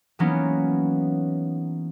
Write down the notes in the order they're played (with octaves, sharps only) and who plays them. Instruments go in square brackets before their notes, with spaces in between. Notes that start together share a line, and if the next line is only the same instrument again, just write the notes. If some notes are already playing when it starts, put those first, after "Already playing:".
[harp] E3 F#3 A#3 B3 C#4 D#4